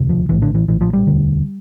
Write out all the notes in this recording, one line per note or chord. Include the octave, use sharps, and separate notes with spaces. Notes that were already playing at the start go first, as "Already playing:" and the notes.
Already playing: E1 D2 C3
F3
A#1 A2 E3
D3
E3
A#1 A2 E3
F3
G3
E1 D2 D3